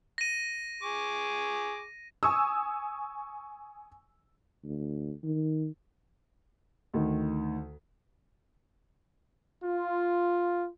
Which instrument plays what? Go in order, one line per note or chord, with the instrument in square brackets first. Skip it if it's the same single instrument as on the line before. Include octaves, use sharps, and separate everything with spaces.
[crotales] A#6 D#7
[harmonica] G#4 C#6 D6
[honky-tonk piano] G#5 C#6 D#6 E6
[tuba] D2
D#3
[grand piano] D2 D#3
[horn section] F4